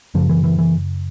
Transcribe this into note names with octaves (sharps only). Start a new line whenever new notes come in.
F#2 C#3 F3
E3
E3
E3